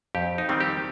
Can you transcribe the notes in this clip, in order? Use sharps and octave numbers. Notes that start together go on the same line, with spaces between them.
F2 G4
D#4
D#3 G3 C4
G4